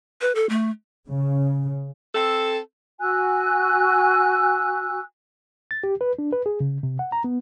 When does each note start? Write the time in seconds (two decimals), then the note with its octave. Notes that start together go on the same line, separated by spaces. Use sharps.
0.21 B4
0.35 A4
0.49 A3
1.09 C#3
2.15 C4 A4
3.00 F#4 G#5 E6 F#6
5.71 A6
5.84 G4
6.01 B4
6.19 D4
6.33 B4
6.46 G#4
6.60 C#3
6.83 C3
6.99 F#5
7.12 A#5
7.24 B3